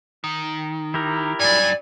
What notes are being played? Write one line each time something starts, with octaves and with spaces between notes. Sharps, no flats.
D#3
E4 G4 A#4
G2 F#3 D5 G#5